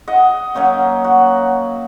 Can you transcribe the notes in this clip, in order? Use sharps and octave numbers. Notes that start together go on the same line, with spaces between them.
D#5 F#5
F#3 A#3 C#4 D#4
F#4